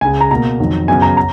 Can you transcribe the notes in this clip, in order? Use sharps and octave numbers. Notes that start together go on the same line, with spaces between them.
C#2 C#3 G#3 G#5
A#5
B2 A#3 A#5
F2 D#3 F#3
F#2 C#3 F#3 B3 G#5
A#5
A#5